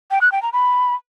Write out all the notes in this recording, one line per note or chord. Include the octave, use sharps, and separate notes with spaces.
G5
F#6
G5
A#5
B5